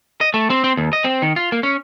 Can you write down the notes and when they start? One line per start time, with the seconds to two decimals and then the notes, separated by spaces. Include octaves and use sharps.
0.21 D#5
0.34 A3
0.50 C4
0.64 C4
0.77 D#2
0.93 D#5
1.04 C4
1.22 D#3
1.36 F4
1.52 A#3
1.63 C#4